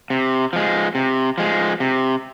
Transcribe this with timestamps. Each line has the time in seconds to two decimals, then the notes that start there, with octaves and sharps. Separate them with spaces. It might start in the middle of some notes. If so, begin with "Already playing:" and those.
0.10 C3
0.53 F3 G#3
0.95 C3
1.38 F3 G#3
1.80 C3